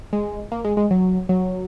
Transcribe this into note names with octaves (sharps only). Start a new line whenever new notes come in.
G#3
A#3
G#3
G#3
F#3
F#3